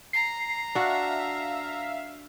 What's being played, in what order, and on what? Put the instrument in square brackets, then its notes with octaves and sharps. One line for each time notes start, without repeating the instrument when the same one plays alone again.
[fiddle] A#5 [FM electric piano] C7
[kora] D4 F#4 [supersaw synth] E5 F5